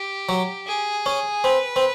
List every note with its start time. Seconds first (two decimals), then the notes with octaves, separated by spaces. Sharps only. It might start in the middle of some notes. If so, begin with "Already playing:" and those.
Already playing: G4
0.29 F#3
0.67 G#4
1.06 C#4
1.44 C4 B4
1.76 C4